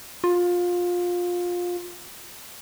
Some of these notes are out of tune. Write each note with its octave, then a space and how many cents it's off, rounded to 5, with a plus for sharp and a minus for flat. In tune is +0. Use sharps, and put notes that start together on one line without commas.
F4 +20